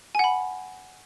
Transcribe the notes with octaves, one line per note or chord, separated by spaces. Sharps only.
F#5 G#5 B5